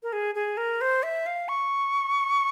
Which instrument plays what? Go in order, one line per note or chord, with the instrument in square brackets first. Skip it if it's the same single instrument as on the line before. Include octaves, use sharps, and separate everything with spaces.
[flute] A#4
G#4
G#4
A#4
C5
E5
F5
C#6